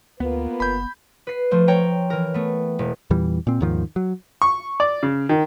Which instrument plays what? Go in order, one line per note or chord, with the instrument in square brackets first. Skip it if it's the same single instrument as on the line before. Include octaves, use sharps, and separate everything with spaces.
[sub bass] D2 [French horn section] A#3 F4 B4 [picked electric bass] B3
[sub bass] F#1 [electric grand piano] B5 G6
[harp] B4 C7
F3 A3 C5
C#5 G5 A#5
E3 A#4
A3 B3
E1
[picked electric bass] E2 A#2 E3 G3
A#2 C4
D#2 G#2 D#3 F3
F#3
[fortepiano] C#6
D5
C#3
D#3